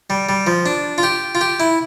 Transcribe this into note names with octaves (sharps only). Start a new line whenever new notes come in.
G3
G3
F3
D4
F4
G4
F4
G4
E4